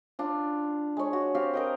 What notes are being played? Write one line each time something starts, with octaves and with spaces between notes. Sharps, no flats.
D4 F4
G#3 C#5
F#4
C4 G4 F5
A#4 D#5 G5